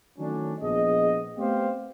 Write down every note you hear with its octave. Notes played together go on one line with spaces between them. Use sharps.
D#3 F#3 A3 C#4 D4
A#1 B3 G#4 D#5
A3 B3 C4 G4 C5 F5